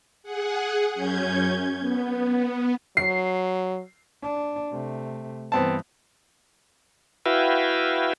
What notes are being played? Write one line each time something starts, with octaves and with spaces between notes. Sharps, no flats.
G#4 F#5
F#2 C#4 G6 G#6
B3
F#3 C7
D4
C3 A3
G2 E3 B3 C4 A5
E4 F#4 B4 E5 F5 G5